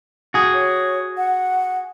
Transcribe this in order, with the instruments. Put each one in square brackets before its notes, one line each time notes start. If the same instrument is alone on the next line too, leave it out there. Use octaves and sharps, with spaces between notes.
[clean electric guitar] F#4 G#4
[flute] C#5
F#5